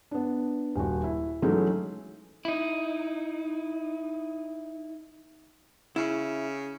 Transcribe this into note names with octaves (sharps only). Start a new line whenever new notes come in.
B3 D4
D#1 F#4
E4
E3 F#3 G#3 A3 C#4 D#4
D#4 E4
C#3 E4